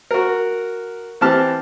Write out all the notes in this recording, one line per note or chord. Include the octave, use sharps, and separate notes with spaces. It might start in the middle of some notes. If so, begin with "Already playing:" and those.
F#4 A#4
E3 C4 G4 A5 F6